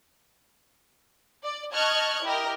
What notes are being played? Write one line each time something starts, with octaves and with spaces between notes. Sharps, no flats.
D5
D#5 A5 C#6 F6 F#6 G#6
E4 G4 A#4 D#5